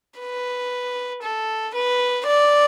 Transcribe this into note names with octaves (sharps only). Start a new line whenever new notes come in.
B4
A4
B4
D5